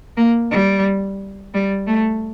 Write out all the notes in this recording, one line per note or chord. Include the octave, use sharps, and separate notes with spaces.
A#3
G3
G3
A3